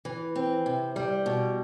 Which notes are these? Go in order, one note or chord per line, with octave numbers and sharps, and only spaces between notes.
E3
C4
C3
G3
B2